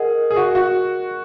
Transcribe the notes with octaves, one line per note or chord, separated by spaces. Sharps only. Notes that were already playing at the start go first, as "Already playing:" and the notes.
Already playing: G#4 A#4 D#5 F#5
G#4
F#4
F#4